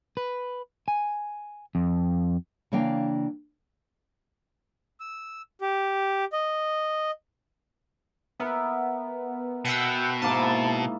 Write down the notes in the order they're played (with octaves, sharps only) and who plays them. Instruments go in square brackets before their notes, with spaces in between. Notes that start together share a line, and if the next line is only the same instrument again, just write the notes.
[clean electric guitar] B4
G#5
F2
[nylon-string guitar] C#3 E3 A#3 D4 F5 G5
[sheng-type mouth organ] E6
G4
D#5
[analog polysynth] B3 [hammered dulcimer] A#4 E5
[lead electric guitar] B2 [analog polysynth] F#5 G5 E6
[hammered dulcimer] G#2 A#3 E4 [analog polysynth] A5